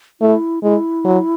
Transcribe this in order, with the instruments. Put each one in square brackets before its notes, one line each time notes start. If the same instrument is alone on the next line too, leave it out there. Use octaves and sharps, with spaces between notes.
[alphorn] A3 [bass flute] E4
[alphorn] G#3 [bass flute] E4
[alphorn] F#3